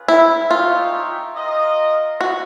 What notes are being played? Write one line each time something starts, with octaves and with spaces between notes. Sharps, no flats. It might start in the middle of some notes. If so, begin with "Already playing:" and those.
Already playing: C#4 F4 G#4 B4
E4
D#4 F4 G#4 C#5 E5 G5
F4 A#4 D#5
F#4